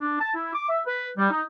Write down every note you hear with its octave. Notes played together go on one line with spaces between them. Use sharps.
D4
A5
E4
D6
E5
B4
G3
D#4